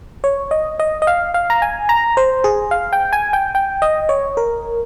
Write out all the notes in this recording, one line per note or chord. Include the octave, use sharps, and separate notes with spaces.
C#5
D#5
D#5
D#5
F5
F5
A#5
G#5
A#5
C5
G#4
F5
G5
G#5
G5
G5
D#5
C#5
A#4